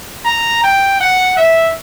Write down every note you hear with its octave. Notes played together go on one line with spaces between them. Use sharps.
A#5
G5
F#5
E5